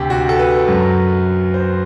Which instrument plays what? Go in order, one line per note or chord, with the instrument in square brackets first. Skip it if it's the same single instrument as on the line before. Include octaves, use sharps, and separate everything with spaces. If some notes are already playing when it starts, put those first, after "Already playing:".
Already playing: [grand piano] D2 C3 G4
F#4
A4
B4
F#2 F#3
C5